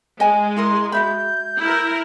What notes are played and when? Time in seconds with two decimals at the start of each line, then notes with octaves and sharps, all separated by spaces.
0.20 G#3 D#5 G#5
0.57 E4 G#4 A#4 C6
0.92 F#4 E5 B5 G6
1.59 E4 A#4